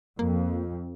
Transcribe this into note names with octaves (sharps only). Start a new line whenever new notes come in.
F2 A#3